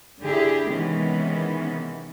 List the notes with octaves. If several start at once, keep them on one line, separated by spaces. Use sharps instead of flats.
D3 E4 G4 G#4
C3 D#3 E3 G#3 B3 C#4